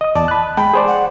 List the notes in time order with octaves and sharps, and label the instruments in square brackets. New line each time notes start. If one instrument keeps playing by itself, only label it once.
[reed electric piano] D#5 D#6
[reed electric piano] E2 D5 [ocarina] A5
[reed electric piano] B5 F#6
[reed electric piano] G#3 G5 A5 [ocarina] B5
[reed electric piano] G#4 C5 D5
[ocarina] F#5